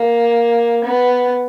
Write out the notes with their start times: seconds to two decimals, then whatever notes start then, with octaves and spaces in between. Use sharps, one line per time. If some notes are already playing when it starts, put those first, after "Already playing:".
Already playing: A#3
0.84 B3